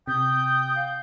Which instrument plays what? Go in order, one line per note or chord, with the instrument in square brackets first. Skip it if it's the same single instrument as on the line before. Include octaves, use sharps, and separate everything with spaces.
[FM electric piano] C3 [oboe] G5 [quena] D#6 [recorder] G6
[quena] F5